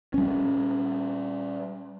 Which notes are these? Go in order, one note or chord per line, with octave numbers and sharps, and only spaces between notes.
G3 C#4